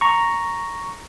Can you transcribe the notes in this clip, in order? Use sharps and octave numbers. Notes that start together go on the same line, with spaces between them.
A#5 C#6